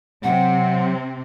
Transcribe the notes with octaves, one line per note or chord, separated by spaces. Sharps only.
C3 F#3 C4 F#5